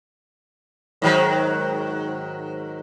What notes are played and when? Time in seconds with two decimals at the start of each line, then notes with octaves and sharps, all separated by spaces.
1.02 G#2 D#3 F#3